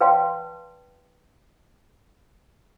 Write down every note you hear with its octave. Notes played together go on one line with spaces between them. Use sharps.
B4 D5 F5 G5 A5 C6